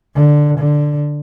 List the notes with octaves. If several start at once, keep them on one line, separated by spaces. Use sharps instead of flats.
D3
D3